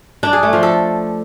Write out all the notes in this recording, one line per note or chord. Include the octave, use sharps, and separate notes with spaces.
D4
G#4
A3
F3
A4